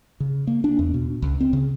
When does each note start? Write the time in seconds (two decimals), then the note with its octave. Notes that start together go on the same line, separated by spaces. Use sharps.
0.20 C#3
0.47 A#3
0.64 D4
0.79 E2
0.94 B2
1.22 C#2
1.41 C4
1.53 C#3